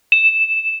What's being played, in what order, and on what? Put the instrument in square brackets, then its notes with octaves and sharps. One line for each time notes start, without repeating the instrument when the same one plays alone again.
[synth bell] E7